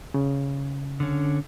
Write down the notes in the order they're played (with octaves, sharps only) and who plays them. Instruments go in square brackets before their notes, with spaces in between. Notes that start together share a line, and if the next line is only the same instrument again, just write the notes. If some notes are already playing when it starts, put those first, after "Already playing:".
[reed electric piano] C#3
[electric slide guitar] D3 C#4